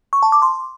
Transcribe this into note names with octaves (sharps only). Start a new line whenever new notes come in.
C#6
A5
D6
C6